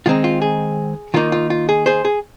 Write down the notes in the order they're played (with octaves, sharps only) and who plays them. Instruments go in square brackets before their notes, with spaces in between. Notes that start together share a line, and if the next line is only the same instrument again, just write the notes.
[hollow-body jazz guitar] D#3 G#3 C4 D#4 F4
F4
G#4
D#3 A#3 D#4 F4
F4
F4
G#4
G#4 C5
G#4